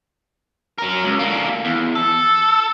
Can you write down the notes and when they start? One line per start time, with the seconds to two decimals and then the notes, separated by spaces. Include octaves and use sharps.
0.78 F#3 A#4
1.03 C#2
1.19 D3 A#3
1.65 E2
1.95 A4